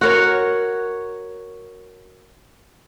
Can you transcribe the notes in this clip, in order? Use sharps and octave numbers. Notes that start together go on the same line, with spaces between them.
F#4 A#4 C#5